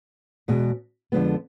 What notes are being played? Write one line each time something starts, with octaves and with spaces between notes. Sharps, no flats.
E2 B2 G#3
F2 D3 F3 G#3 B3